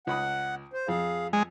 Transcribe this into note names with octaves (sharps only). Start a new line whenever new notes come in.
C#2 F#5 B5 D#6
C5
F2 G#4 F5
G#3